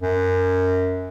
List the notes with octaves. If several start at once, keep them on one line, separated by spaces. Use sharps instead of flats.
F#2